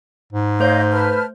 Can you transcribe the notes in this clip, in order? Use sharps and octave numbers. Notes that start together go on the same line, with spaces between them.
G#2
A3 C5 C#5 D#5 F5 G6
B4 A5 F6